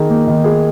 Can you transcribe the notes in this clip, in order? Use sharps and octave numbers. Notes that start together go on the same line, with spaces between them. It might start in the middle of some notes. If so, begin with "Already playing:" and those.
Already playing: D#3 D#4 G#4
A#3
D#3
G#4